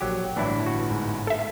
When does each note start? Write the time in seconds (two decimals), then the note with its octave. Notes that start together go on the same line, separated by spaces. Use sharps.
0.01 A#1 F#3 G4
0.36 G1 A2 E3 D4 E4
0.66 F#4
0.90 G#2
1.27 A4 E5